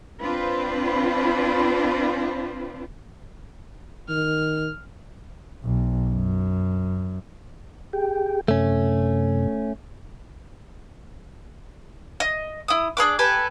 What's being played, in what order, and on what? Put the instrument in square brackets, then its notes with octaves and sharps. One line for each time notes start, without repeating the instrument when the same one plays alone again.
[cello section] C4 D4 F4 B4 C5
[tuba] D#3 [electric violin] F6
[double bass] B1
F#2
[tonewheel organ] G4 G#4 G5
[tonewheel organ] F#2 C3 [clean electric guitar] A3 C#4
[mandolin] D#5
E4 D#6
D4 G#4 B4 D6
G4 A4 B4 G#5